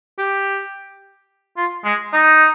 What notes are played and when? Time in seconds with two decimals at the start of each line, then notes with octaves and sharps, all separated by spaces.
0.18 G4
1.57 F4
1.85 G#3
2.13 D#4